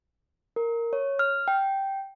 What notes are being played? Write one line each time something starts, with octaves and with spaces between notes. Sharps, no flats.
A#4
C#5
F6
G5